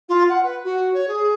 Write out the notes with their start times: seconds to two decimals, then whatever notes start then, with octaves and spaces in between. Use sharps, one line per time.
0.09 F4
0.29 F#5
0.42 B4
0.64 F#4
0.93 C#5
1.08 G#4